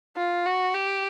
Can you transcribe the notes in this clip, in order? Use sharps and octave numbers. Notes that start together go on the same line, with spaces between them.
F4
F#4
G4